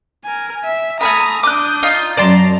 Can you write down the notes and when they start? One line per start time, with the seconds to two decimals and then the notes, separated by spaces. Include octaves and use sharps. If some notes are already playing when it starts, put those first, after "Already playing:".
0.24 A#4 G#5
0.64 E5
1.01 A3 G#5 A#5 B5 D#6
1.43 D4 D6 D#6 F#6 G6
1.83 D#4 F4
2.17 F#2 D5 A5 A#5 C6